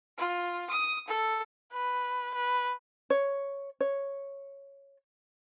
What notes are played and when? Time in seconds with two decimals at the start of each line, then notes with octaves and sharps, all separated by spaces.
0.18 F4
0.70 D#6
1.08 A4
1.73 B4
2.35 B4
3.10 C#5
3.80 C#5